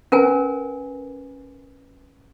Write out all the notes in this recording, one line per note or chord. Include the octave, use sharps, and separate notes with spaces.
C#4 A#4 B4 G#5